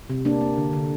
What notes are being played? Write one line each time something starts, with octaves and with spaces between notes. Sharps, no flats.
C3
A#3 D4
A#3
D3
D3